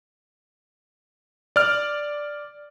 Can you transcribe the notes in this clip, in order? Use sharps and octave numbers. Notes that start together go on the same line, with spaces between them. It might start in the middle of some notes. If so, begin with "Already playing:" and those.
D5 F6